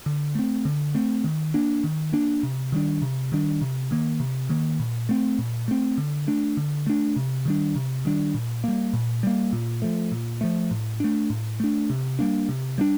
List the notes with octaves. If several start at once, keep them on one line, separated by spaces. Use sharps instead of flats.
D3
A3 C4
D3
A3 C4
D#3
A#3 D4
D#3
A#3 D4
C3
D#3 G3 D4
C3
D#3 G3 D4
C3
D#3 A#3
C3
D#3 A#3
A#2
A3 C4
A#2
A3 C4
D3
A3 D4
D3
A3 D4
C3
D#3 G3 D4
C3
D#3 G3 D4
A#2
G3 A#3
A#2
G3 A#3
A#2
F3 A3
A#2
F3 A3
A2
A3 D4
A2
A3 D4
C3
G3 A#3 D4
C3
G3 A#3 D4